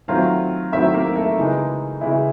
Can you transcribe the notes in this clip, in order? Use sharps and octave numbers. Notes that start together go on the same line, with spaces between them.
D#3 F#3 A3 C4 F4 F5
D#3 F#3 A3 C4 E4 E5
A#3 A#4
A3 A4
C#3 E3 G#3 D#4
C#3 E3 G#3 E4